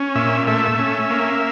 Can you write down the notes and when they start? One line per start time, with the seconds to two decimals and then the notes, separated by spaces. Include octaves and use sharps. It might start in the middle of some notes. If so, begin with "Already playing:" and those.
Already playing: C#4
0.16 A#2 E5
0.47 A3 E5
0.79 C#4
1.10 A#3